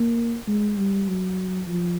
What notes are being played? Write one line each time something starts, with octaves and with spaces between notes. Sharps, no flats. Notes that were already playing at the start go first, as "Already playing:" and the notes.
Already playing: A#3
G#3
G3
F#3
F3